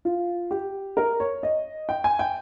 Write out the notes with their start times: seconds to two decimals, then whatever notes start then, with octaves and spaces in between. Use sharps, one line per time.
0.05 F4
0.51 G4
0.97 A#4
1.20 C#5
1.43 D#5
1.89 G5
2.04 G#5
2.19 G5